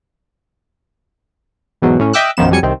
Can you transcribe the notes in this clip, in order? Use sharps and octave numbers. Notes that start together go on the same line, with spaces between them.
E2 G#2 B2 F#3
A2 C#4
D#5 E5 G5 D6 E6 F#6
B1 F#2 D#3 F3 B3 E7
F2 F#3 G3 G#5 C#7
C2 D#3 C4